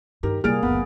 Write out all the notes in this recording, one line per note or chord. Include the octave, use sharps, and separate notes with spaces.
G2 D#3 G4 A#4
G2 C3 G3 A#3 G#4 F6 A6 D7
F#1 D2 B3